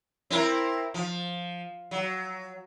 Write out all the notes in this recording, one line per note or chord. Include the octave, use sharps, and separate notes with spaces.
C4 E4 A#4
F3
F#3